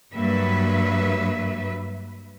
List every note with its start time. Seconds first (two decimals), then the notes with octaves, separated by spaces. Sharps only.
0.14 G2 F#3 A#3 B4 E5